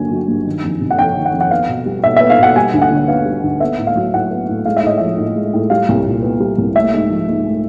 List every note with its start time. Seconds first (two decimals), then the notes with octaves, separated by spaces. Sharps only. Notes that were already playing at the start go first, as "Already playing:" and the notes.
Already playing: G2 D3 F#3 A#3 G#5
0.11 F#3
0.28 G2
0.46 D#3
0.64 F2
0.81 C3
0.91 F#5
0.99 F2 G5
1.17 D#3
1.25 F#5
1.33 F2
1.41 F#5
1.51 B3 F5
1.68 B2
1.86 G3
2.04 B2 E5
2.16 B3 E5
2.30 F5
2.39 B2 F#5
2.56 G3 G#5
2.74 D2
2.82 F#5
2.91 D3
3.08 B3 F5
3.25 G3
3.44 D2
3.60 B3 E5
3.78 A2
3.87 F5
3.96 F#3
4.13 A2 F#5
4.31 B3
4.49 A2
4.66 G#3 F5
4.77 E5
4.83 A2 D#5
4.97 F3 E5
5.18 A2
5.36 G#3
5.53 A2
5.70 G3 F5
5.89 C2
6.06 A#2
6.22 B3
6.40 G3
6.58 C2
6.75 A3 E5
6.93 G#2
7.10 F3
7.28 G#2
7.46 A3